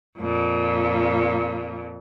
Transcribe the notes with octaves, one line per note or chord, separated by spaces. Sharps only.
F2 A#2